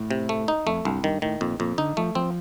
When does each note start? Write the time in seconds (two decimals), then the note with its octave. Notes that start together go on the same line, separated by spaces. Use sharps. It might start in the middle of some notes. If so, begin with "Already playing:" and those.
Already playing: A2
0.11 C3
0.29 A3
0.48 D#4
0.66 F2 A3
0.85 C2 G2
1.04 G2 D#3
1.22 A2 D#3
1.41 F2 A#2
1.59 F2 A#2
1.78 D3 D#4
1.97 F3 A3
2.15 F3 C4